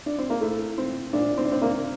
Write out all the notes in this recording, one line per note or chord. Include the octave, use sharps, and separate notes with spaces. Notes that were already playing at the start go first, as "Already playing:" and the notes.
D4
C4
A#3
A2 A3
C4
A#2 D4
C4
D4
C4
A#3